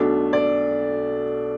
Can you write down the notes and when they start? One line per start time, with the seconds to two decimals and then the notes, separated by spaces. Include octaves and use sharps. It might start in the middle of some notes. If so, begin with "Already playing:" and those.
Already playing: B1 B2 A3 D4
0.33 D5